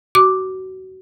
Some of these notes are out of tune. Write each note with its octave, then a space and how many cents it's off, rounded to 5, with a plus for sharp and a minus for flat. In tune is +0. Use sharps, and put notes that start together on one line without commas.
F#4 +25 D6 +0